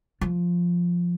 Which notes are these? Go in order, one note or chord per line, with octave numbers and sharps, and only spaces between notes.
F3